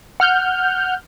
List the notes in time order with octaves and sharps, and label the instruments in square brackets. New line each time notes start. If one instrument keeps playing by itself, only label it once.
[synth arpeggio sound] F#5 F6 G6